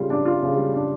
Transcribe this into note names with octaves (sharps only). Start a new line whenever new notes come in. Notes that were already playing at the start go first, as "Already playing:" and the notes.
Already playing: C#3 G3 F4
D4
F4
C#3
G3
D4